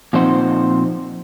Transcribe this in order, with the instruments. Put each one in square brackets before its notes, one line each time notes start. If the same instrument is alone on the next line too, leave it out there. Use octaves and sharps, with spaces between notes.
[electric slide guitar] A#2 F3 C4 D#4 C5 F#5